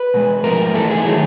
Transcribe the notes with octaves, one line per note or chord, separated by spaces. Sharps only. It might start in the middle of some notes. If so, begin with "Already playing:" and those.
Already playing: B4
B2 G#3
G#2 F3 A3 A#4
G#2 E3 A3 A4
G#4
D#4
D#3 F#3 A3 E4